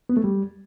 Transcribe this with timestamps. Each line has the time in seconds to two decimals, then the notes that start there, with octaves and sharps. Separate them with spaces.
0.09 B3
0.17 A3
0.24 G3